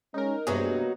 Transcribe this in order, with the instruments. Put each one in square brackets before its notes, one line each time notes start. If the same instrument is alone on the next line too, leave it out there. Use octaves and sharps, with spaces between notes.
[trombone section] G#3 C#4 [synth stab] D#4 A#4
[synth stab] G2 C3 G#4 [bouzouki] F#3 D#4 F#4 [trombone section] A#3 B3